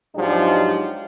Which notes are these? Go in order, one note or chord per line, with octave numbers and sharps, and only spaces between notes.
G#2 F3 F#3 D4 D#4 G4